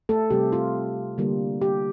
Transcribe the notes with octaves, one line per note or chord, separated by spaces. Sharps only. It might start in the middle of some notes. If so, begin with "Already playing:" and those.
A3 A4
C3 G3 C4 G4
F4
D3 G3 A#3 F4
G4